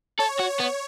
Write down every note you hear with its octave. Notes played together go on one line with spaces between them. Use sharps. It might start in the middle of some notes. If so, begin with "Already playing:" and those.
A4 C#5
F#4
C#5
B3